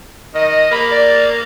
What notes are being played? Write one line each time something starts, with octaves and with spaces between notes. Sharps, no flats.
D#3 D#5
A#3 B5
D5